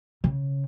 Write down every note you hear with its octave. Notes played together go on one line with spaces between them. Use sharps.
C#3